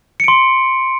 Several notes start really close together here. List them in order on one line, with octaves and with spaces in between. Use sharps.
C#7 D7 C6